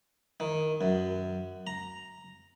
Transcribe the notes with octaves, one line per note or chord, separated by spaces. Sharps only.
D#3
F#2
A#5